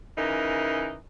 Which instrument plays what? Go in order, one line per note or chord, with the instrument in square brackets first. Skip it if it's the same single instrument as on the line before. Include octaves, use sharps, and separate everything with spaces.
[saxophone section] C#3 E3 D#4 A#4